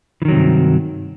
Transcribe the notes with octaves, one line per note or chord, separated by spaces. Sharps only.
G2 C3 D#3 E3 F#3